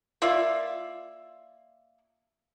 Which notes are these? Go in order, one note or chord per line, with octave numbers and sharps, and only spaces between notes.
A#3 F4 D5 E5